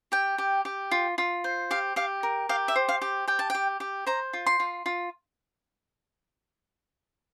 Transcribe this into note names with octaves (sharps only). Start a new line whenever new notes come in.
G4 G5
G4
G4
F4
F4
C5
G4 F5
G4 F5
A#4
G4 F5
E5
C5
F5
G4
G4 G5
A5
G4 G5
G4
C5 A#5
F4
C6
F4
F4